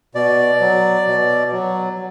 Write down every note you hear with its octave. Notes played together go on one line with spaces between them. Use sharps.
B2 D5
F#3
B2
F#3